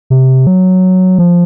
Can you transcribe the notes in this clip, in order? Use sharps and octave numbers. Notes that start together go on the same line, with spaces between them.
C3
F#3
F3